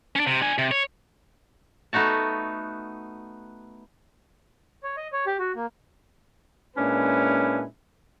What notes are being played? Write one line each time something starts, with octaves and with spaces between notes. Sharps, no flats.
C#4 D4
C3
D4 G#5
C3
C#5
A3 B3 D#4 F#4 A5
C#5
D#5
C#5
G4
F#4
A#3
A#2 G#3 C#4 D4 E4 B4